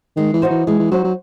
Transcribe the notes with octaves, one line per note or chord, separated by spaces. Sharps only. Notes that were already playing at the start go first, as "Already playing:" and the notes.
D#3 G#3
E3
D#4 F#4 C5
E3
E3 G#3
E3
F#3 D#4 F#4 C5
F#3